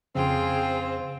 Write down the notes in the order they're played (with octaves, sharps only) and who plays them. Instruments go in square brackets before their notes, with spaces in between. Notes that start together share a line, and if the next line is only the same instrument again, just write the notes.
[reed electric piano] F2 C#3 [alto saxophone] C4 [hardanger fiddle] F4 G5 [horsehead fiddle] G#4